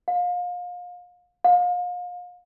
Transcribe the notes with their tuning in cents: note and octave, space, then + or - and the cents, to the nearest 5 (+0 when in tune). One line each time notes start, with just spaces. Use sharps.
F5 +30
F5 +35